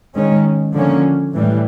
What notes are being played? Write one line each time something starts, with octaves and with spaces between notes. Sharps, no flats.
D#3 G#3 C#4
D3 F3 A#3 C#4
A2 E3 G3